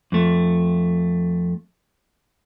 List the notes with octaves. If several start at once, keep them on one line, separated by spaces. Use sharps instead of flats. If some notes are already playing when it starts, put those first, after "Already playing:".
F2 A3